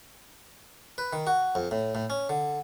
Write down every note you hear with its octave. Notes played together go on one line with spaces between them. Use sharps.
B4
D#3
F#4
F2
A2
A2
C#4
D3